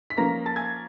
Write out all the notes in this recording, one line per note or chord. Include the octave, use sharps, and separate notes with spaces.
B6
F3 A#3 C#4 A#5 A#6
A5 A6
G#5 G#6